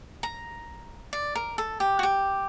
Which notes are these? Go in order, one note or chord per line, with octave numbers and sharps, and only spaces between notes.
A#5
D5
A#4
A4
G4
F#4
G4